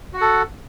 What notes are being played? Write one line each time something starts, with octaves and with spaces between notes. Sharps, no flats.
F#4 A4 F#5